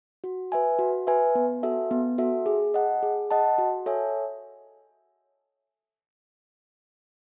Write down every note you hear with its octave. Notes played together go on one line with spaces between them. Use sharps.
F#4
B4 E5 G#5
F#4
B4 E5 G#5
B3
F#4 A4 E5
B3
F#4 A4 E5
G#4
D#5 F#5 A5
G#4
D#5 F#5 A5
F#4
A4 C#5 E5 G#5